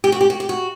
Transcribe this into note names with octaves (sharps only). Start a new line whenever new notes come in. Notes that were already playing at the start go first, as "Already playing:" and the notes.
G4
F#4
G4
F#4
G4
F#4